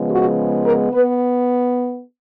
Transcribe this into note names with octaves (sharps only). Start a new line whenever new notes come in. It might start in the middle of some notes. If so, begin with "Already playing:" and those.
Already playing: C#3 F3 G#3 B3
F#4
A#4
B3 B4